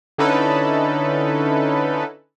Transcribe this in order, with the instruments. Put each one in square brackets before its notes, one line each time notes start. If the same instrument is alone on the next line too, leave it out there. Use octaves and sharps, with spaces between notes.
[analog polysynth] D3 C#4 D#4 E4 A4 B4